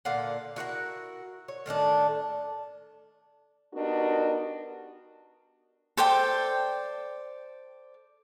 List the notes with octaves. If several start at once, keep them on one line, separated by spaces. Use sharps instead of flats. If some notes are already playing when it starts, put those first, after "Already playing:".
A#2 D3 F5 F#5
E4 F#4 A#4 F#5
C#5
A2 D#3 A3 D4
B3 D4 D#4 F#4 G4 A#4
A4 C5 D5 G5